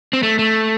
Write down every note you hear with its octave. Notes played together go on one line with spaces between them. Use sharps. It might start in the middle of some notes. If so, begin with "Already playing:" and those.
C4
A3
A3